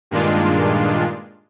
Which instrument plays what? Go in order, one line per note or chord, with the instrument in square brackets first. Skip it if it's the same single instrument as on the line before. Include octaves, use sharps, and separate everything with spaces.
[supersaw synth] G2 A#2 D#3 G#3 D4 F4